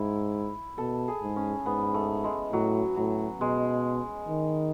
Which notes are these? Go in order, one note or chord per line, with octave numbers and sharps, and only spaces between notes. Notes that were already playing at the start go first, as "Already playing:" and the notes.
Already playing: G#2 E4
B2 A4
G#4
G#2
C#4
G#2 B3
A3
G#3
A2 F#3
A2 F#3
B2 G#3
D#3